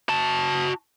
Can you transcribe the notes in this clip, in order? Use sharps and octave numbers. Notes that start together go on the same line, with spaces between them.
F#4 A5